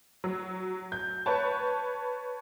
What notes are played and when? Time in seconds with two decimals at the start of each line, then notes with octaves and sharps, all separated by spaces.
0.24 F#3
0.92 G6
1.26 B4 C#5 A5